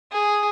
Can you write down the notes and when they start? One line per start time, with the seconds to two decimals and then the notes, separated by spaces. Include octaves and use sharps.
0.12 G#4